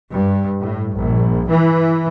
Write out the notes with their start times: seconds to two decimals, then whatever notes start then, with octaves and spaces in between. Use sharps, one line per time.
0.11 G2
0.60 A2
0.96 A#1
1.50 E3